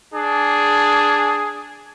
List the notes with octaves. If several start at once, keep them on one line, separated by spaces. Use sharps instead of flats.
D4 G#4